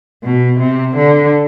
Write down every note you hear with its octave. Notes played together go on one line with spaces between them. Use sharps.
B2
C3
D3